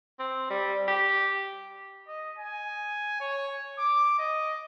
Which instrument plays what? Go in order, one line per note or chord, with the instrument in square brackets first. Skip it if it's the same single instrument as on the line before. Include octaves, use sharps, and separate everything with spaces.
[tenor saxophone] C4
G3
G4
[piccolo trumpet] D#5
G#5
C#5
D6
D#5